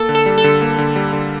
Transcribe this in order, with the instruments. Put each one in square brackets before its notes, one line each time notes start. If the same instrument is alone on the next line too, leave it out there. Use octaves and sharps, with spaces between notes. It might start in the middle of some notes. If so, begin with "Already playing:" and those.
Already playing: [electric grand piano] A#3 [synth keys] A4
[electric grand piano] D3
[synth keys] A4
[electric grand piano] G3
[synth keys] A4
[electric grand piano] D3
A#3
D3
G3
D3